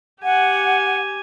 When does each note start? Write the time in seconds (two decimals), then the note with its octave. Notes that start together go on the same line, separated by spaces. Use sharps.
0.23 G4 F#5 G#5